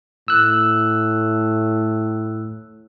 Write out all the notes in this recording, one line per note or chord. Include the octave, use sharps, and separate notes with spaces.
A2 E6 F#6